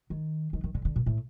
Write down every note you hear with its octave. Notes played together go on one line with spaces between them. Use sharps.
D#3
D#3
D#3
D3
D3
A#2
A2